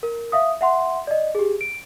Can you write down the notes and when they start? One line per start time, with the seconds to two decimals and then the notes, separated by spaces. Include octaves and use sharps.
0.03 A#4
0.32 E5 F5 D#6
0.61 E5 F#5 C6
1.07 D5 D#5
1.35 G4 G#4
1.61 D7